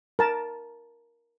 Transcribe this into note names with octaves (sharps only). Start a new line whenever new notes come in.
A#4 A5